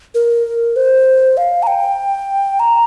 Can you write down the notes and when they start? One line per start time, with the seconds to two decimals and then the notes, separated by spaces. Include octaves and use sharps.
0.15 A#4
0.76 C5
1.37 F5
1.63 A#5
1.67 G5
2.60 A#5